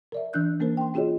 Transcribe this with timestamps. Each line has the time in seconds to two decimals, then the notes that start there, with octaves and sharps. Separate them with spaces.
0.12 A#4 D5 E5
0.33 E3 C#4 D4 F#6 G6
0.60 E3 A#3 C#4 A#4 C5
0.77 G5 C6
0.94 C#4 F4 F#4 G#4 C#5 D#5